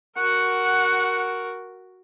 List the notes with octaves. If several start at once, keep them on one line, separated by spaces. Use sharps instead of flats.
F#4 A#4 F#5